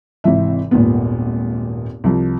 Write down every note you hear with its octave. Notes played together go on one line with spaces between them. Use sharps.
G#1 C3 E3 E5
D#1 G#1 D#2 A#2 B3
C2 F3